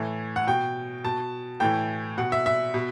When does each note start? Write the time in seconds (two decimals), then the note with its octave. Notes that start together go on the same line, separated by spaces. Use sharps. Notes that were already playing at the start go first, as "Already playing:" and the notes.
Already playing: A2 E3
0.36 F#5
0.47 B2 G5
1.04 B2 A5
1.60 A2 E3 G5
2.17 B2 F#5
2.32 E5
2.46 E5
2.74 B2